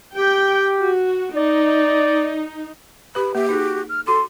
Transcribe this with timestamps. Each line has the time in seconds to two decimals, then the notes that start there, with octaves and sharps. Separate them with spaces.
0.16 G4 G5
0.79 F#4
1.36 D#4 D5
3.15 G4 B4 B5
3.35 A#3 G4 E5
3.49 D#4 F#4 G#4
3.89 F6
4.07 F#4 A4 C6 D6